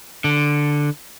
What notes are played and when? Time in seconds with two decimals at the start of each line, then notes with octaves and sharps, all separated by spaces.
0.24 D3